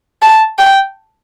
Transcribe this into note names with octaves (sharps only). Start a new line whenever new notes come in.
A5
G5